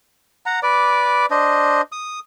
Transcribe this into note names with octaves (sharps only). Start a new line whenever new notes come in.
F#5 A#5
B4 D5 D6
D4 C5 D#5
D#6